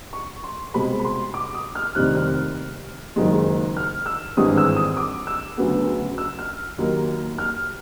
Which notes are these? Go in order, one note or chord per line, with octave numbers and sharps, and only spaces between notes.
C#6
C6
C2 B2 G#3 C4 B5
B5
C6
D6
D#6
F6
F1 D#2 D#3 G3 C4 F#6
F6
F#1 F#2 D#3 G#3
F6
E6
G#1 G2 E3 G#3 D#6
E6
D#6
D6
E6
D2 C#3 F#3 B3
E6
F6
D#2 D#3 F#3 A#3
F6